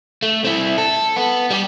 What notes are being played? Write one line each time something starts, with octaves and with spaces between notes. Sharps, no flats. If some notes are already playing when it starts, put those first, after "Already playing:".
A3
C4 E4
A4
B3
G3 G4